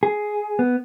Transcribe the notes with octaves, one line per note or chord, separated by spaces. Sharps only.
G#4
B3